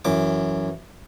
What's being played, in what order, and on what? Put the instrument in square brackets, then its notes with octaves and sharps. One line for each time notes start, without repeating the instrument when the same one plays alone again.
[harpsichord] F#2 E3 D6